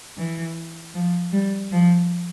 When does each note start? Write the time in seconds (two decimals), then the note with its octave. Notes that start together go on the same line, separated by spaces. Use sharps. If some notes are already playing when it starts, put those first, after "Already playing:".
0.17 E3
0.93 F3
1.32 G3
1.71 F3